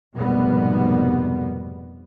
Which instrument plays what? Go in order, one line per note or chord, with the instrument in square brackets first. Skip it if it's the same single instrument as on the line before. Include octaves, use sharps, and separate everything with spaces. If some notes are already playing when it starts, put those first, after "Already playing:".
[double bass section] F1 G#2 B2 G3 A#3 B3